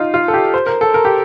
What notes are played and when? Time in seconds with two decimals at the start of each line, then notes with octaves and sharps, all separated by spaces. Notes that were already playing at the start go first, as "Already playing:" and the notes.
Already playing: D#4 F4
0.14 F4
0.28 A4
0.34 G4
0.54 C5
0.66 A#4
0.81 A4
0.94 A#4
1.05 G4